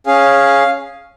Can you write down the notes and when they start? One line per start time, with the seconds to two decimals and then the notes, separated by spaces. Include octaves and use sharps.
0.06 C#4 G#4 F5